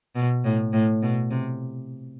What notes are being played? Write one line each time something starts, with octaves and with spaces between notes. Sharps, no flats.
B2
A2
A2
B2
C3